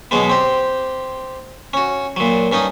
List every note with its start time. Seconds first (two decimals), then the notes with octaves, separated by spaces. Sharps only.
0.11 B2 F#3 G#3 B3
0.29 C4 G4
1.73 C#4 F#4
2.16 A#2 F#3
2.52 G2 C#4 D#4 D#5 D#6